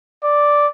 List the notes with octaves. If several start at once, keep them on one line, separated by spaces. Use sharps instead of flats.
D5